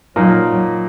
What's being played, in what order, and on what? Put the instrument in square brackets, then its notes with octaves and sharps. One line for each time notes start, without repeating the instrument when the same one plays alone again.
[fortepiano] A#2 F3 A#3 D#4 [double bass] F#3